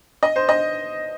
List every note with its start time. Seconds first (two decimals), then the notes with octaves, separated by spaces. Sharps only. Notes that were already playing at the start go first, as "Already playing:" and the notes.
0.23 D#5
0.36 C5
0.49 D#5